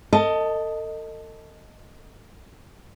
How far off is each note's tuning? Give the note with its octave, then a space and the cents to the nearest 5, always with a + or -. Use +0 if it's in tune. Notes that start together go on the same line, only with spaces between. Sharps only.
A4 +40 D#5 +0 A5 +0